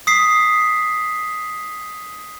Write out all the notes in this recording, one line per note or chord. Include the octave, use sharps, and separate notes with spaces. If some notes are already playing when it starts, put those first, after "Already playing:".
D#6 B6 C7